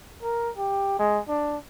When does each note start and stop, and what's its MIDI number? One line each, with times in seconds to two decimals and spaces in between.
0.23 0.49 70
0.57 0.94 67
0.99 1.19 56
1.28 1.57 62